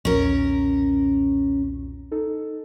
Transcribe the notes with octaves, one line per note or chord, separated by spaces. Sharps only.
B1 E2 A#2 C#4 A#4
D#4 A4